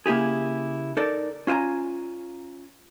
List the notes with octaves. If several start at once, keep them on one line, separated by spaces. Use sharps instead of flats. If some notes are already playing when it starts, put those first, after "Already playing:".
C#3 A#3 E4 G4 G#4
D#4 A4 A#4 D5
C#4 F4 D5 G#5 A#5